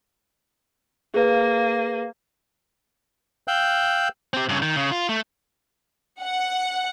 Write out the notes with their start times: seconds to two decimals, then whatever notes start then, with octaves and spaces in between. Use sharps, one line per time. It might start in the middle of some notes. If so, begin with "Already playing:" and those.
1.14 A#3 G#4 B4 F5
3.48 F5 G5 E6 F#6 G6
4.33 C4 G4
4.49 G2 C#3
4.62 D#3
4.76 C#3
4.92 F4
5.09 A3
6.22 F#5